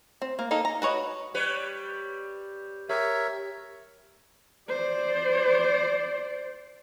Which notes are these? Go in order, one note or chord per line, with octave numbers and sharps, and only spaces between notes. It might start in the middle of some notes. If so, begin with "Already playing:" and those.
C4
A#3
A#3 D#4 A4
A#5
F#4 B4 C#5 D#5
G3 B4 C#5
G4 A#4 C#5 E5
C5 D5